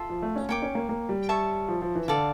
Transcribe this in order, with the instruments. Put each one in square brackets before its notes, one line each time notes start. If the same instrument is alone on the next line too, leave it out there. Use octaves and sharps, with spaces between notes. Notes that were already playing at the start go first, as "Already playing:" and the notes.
Already playing: [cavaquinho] F4 A4 E5
[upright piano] F3
A3
C#4
[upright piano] A#3 [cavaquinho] C#5 G5 D6
[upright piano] C#4
A#3
A#3
G3
[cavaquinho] C#5 E5 A5 C#6
[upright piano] F3
F3
E3
[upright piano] D3 [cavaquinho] A4 D5 F5